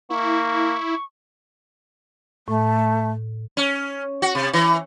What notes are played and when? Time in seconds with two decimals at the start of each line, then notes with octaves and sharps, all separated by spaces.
0.10 A#3 E4 C#6
2.48 A2 A3
3.57 C#4
4.22 F#4
4.35 C3
4.53 E3